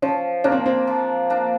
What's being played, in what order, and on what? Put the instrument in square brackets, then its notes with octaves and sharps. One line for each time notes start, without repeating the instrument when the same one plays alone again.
[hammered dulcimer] F3 [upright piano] C#4
[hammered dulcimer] A#3 D4 [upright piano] C#4
[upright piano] C4
C4
[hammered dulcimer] F3
A#3 D4